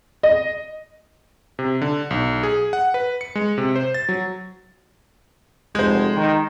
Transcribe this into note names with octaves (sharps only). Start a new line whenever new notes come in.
D#5
C3
D3
B1
G#4
F#5
B4
C#7
G#3
C3
C5
A6
F#3
F1 G#3 C5
D#3